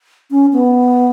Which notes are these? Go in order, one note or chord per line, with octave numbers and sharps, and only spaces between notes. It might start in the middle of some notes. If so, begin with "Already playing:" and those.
C#4
B3